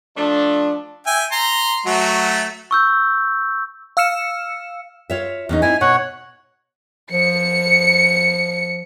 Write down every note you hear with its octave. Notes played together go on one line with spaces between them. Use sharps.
F3 A3 D4
E5 G5 G#5
A#5 C6
F#3 A3 F#4
C#6 E6 G6
F5 E6 F6 C#7 E7
F4 C#5 E5
E2 C#4 D#4
C4 D#4 E4 G#5
B2 C#5 F#5
F3 C#7